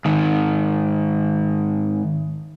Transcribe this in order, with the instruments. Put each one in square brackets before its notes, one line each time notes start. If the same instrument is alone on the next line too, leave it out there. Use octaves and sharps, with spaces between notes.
[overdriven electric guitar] G#2 D#3